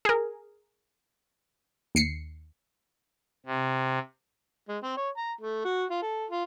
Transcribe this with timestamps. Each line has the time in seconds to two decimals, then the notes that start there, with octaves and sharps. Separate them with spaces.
0.05 G#4 A#4
1.95 D#2 C7 C#7
3.46 C3
4.68 G#3
4.83 C4
4.97 C#5
5.17 A#5
5.41 A3
5.65 F#4
5.91 F4
6.02 A4
6.30 F4